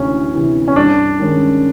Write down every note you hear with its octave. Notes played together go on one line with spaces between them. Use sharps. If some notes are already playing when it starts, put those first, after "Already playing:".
Already playing: D2 C3 E3 C#4
C3 E3
C#4
G2 D4
D#3 G#3 C#4